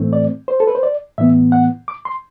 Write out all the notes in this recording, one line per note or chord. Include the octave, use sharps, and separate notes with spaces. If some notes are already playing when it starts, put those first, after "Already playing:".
Already playing: A2 E3 A3 C4
D5
C5
A4
B4
C5
D5
A2 E3 B3 E5
F#5
D6
C6